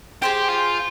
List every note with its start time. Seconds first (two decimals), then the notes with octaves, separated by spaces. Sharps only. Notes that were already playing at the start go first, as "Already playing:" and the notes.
0.22 G4 G#4 C5 G5
0.49 F4